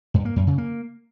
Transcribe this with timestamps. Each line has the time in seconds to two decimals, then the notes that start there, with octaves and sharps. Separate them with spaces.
0.14 G2
0.25 A#3
0.36 F#2
0.47 C#3
0.58 A#3